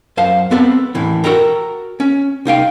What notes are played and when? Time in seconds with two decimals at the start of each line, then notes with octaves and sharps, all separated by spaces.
0.17 F#2 C5 F5 A5
0.51 B3 C4 A4 B4
0.95 D#2 A2 E3
1.24 F#4 A4 A#4 G5 A#5
2.00 C#4
2.45 C2 D#4 F5 G5